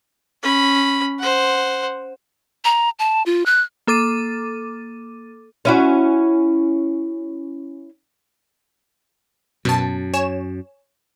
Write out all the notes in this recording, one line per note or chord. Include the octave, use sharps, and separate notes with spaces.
C#4 B5
C5 F#5
A#5
A5
F4
F#6
A#3 A4 D6 A6 D#7
C#4 E4 F#4
F#2 B2 A5
C#5 G#5 E7